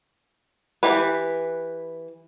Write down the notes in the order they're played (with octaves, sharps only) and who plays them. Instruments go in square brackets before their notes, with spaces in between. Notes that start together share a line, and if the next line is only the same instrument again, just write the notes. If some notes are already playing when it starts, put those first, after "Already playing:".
[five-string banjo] E3 G4 B4